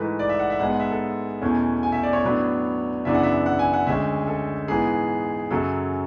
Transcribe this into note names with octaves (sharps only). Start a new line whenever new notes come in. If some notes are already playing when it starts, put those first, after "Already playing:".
Already playing: G#2 E3 A3 B4
D5
E5
F#5
E5
G#2 G#3 B3 F#5
F#5
E5
A4
E2 B2 A3 C#4 E4
G#5
E5
D5
C#5
A2 F#3 B3 D4
F#2 C#3 E3 B3 D4 E5
F#5
E5
F#5
G#5
F#5
D2 D3 G#3 C#4 E5
A4
G#2 E3 B3 G#4
F#2 C#3 F#3 C#4 A4